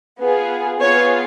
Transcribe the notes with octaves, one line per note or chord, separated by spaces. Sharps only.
B3 F4 G#4
B3 F4 G#4 C#5